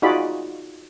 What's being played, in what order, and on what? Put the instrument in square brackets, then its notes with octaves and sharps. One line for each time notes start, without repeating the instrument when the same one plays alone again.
[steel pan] D#4 F4 F#4 G#4 D5 B5